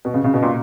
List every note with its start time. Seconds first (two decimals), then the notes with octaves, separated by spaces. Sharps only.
0.05 B2
0.14 C#3
0.24 C#3
0.34 B2
0.42 A#2